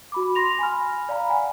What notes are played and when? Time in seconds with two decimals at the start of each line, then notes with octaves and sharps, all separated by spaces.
0.12 F#4 B5 D6
0.35 C6 A#6 F7
0.59 G#5 B5 F6
1.09 D5 F5 A#5 B5
1.30 F#5 G#5